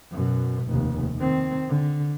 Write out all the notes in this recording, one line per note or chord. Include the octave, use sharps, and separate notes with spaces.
F#2 B2
F1 D#2
D#3 C4
D3